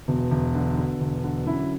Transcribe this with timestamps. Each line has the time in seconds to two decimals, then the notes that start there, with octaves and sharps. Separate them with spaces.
0.08 E1 B2
0.31 E1
0.55 D3
0.78 D3
1.00 E1
1.24 D3
1.47 F#2 E4